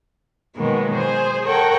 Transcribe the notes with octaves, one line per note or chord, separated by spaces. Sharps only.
B2 D#3 F#3 G#3 A#3 B3
G#4 C5
A4 A#4 C#5 F#5 G5